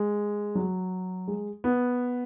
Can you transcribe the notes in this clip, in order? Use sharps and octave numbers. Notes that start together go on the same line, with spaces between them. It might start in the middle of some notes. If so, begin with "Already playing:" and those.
Already playing: G#3
F#3
G#3
B3